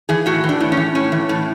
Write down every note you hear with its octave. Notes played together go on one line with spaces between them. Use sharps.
E3 G#4
A2 F#4
E3
D4
A2
C#4
E3
A2 C#4
E3
A2